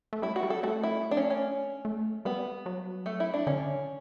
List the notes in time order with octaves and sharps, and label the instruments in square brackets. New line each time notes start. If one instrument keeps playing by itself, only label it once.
[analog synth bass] A3
[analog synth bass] G3 [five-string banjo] E4
[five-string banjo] F#4
[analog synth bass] G3
[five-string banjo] A4
[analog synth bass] A3 [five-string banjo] F#4
[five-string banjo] E4
D4
C#4
C#4
[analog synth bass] A3
[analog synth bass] G3 [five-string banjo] B3
[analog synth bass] F#3
[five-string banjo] A3
E4
D4
[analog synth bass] D3 [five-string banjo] C#4